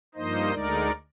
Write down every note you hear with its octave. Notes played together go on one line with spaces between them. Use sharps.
G2 F3 A#3 D#4 C5 D#5
D2 D3 G#3 D#4 A#4 D5